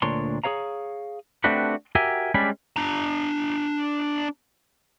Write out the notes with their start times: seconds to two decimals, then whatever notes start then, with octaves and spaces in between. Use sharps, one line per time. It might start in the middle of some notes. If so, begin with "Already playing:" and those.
0.02 D2 A#2 D4 A#4 C#5 C6
0.44 G#4 A#4 C#5 F5 A#5
1.44 A3 C4 D4 F#4 G4 B4
1.95 F#4 G4 A#4 E5 G#5
2.34 G3 G#3 C#4 D4 G#4 B5
2.76 D4 A#5